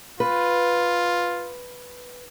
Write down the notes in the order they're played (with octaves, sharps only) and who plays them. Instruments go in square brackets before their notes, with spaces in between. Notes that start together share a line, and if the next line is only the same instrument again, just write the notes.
[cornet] F4 [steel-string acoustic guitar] B4